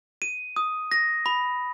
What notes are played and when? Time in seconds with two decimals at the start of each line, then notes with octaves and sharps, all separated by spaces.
0.22 D#7
0.56 D#6
0.92 A#6
1.26 B5